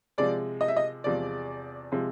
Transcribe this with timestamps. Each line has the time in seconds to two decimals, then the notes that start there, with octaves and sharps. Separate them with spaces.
0.18 C3 F3 G#3 D5
0.61 D#5
0.68 E5
0.77 D#5
1.04 E2 C3 F3 G#3 D5
1.92 C3 F3 G#3